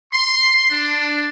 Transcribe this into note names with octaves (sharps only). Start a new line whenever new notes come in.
C6
D4